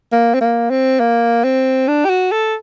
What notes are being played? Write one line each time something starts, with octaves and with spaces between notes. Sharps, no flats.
A#3
C4
A#3
C4
A#3
C4
D4
G4
F#4
A4